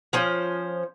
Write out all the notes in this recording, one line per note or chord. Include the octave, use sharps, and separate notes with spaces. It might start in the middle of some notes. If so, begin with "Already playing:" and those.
F3 C#4 C5